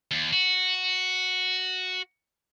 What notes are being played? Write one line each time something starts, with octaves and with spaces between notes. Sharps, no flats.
D#2
F#4